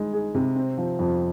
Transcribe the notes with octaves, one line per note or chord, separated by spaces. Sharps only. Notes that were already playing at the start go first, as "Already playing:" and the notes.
Already playing: G#3 D#4
G#4
C3
C4
F3
F2